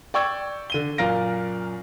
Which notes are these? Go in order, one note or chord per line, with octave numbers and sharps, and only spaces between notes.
D5 G5 C#6 E6 G#6
D3 D#7 G7
F#2 A#2 A#4 F5 A#6 D7